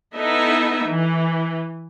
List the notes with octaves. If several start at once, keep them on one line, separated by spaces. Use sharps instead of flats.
B3 D#4 E4 A4 D#5 E5
E3